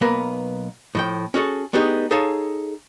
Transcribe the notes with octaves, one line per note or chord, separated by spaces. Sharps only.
B1 A#3 B3 A#4 B4
A2 F3 G5
C#4 F#4 G#4 A4
A3 B3 D4 D#4 G4 G#4
D#4 G#4 A4 C#5 F5 A5